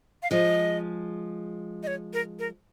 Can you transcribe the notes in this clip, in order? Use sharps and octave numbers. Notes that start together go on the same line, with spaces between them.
F5
F3 G#3 D#5
D#5
C#5
A#4
A#4